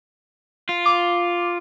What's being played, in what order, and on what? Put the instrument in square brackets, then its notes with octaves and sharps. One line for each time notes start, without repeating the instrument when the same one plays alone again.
[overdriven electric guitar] F4
[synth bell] D6